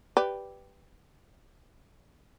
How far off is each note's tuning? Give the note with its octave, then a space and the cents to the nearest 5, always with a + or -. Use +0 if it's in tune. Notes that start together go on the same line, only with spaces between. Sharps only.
G4 +0 B4 +0 D5 +0